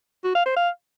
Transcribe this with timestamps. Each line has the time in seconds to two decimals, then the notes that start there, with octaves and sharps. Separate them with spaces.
0.24 F#4
0.35 F5
0.46 C5
0.56 F5